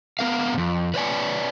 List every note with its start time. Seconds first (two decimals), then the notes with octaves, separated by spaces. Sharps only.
0.19 B3 A#4 F5
0.54 F2 G#2
0.94 B4 C#5 D5 G#5